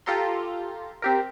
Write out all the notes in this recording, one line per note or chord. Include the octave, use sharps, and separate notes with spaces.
F4 G4 A4 A#5 C6
C4 G4 A#4